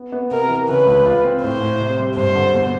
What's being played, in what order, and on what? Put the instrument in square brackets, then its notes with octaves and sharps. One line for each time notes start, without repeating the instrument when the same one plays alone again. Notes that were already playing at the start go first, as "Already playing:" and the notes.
Already playing: [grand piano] B3
B3
[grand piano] C3 [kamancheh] A#4
[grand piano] E3
[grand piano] C#3 [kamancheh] B4
[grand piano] C#2
F4
C4
[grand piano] A2 [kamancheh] C5
[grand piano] A2
C3
G3
[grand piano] G2 [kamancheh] C5
[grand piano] D3
B2